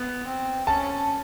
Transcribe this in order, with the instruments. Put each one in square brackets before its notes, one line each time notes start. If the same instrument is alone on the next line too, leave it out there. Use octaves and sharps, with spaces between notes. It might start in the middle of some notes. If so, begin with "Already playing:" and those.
Already playing: [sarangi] B3
C4
[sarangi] C#4 [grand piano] A5